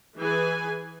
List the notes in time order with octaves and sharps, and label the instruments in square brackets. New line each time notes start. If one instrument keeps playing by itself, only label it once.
[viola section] E3 G#4 B4 G#5